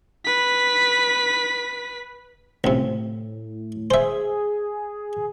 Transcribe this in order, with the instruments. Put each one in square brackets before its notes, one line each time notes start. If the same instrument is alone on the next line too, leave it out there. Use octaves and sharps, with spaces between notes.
[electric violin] B4 B6
[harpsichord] C#2 C3 [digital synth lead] A2
[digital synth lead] G#4 [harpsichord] C5 E5